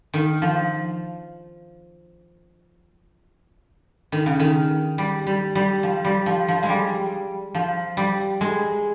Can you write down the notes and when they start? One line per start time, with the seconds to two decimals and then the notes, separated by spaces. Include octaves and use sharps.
0.13 D#3
0.42 F3
4.12 D#3
4.26 C#3
4.40 D#3
4.98 G3
5.27 G3
5.55 G3
5.83 F3
6.05 G3
6.26 F3
6.48 F3
6.63 G#3
6.69 G3
7.55 F3
7.97 G3
8.41 G#3